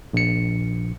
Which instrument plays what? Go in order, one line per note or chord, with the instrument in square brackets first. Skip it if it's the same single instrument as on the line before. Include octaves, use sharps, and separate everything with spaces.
[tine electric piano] A#1 C#7